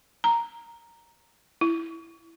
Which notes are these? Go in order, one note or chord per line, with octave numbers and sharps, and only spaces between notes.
A#5
E4